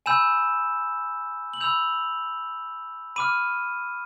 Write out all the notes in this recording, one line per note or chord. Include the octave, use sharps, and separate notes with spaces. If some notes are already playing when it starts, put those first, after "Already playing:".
G#5 B5 E6 G6 E7
F#7
B5 E6 G6 F7
B5 D6 F6 D#7